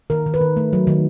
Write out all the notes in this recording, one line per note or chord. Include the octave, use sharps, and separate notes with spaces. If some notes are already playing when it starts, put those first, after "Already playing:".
D#3 A#4
D#3
B4
D#3
A3
F#3
D#3